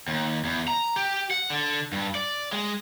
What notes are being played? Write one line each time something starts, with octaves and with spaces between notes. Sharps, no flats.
D#2
E2
A#5
G4
F#5
D3
G2
D5
G#3